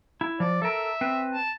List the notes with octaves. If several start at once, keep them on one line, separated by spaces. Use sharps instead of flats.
E4
F3 D5
A4 A#4 E5
C4 B4
A5